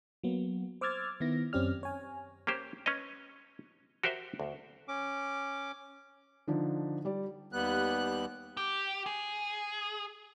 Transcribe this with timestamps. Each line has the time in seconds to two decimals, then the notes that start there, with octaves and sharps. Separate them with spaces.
0.23 F#3 A#3 B3
0.81 C5 D6 E6 F6 G#6 A6
1.20 D#3 B3 E4 A#6
1.53 F#2 C4 C#4 G4 D5 F6
1.83 C#5 G#5
2.47 A#3 C#4 G4 C5
2.86 C#4 B4 C#5 D#5
4.03 F#4 G4 A#4 C5 E5 G5
4.40 D2
4.88 C#4 D6
6.48 D3 F3 D4 D#4
7.05 G3 D5
7.53 D#2 G3 B3 F#6
8.57 G4
9.06 G#4